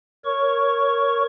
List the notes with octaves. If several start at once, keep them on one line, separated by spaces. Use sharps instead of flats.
A#4 C#5 C#6